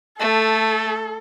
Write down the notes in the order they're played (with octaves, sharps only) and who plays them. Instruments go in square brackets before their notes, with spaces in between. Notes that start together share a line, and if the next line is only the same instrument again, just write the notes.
[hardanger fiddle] A3 [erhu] A4